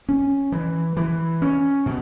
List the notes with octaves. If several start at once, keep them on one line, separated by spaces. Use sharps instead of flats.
C#4
E3
E3
C#4
B2